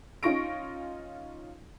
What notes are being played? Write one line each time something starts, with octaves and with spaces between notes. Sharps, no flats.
C#4 D#4 F4 C#6 A#6 D7